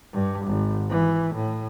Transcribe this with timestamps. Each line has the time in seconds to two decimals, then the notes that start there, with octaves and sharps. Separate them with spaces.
0.13 G2
0.46 G#1
0.90 E3
1.34 A2